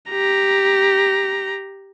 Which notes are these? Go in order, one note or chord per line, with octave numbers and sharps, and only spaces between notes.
G4 A#5